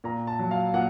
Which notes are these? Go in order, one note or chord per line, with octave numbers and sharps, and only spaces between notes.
A#2 A#5
A5
F#3
F5
A#2 F#5